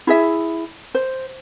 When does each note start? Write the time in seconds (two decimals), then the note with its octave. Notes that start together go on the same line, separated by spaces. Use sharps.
0.07 E4 G#4 E5
0.95 C5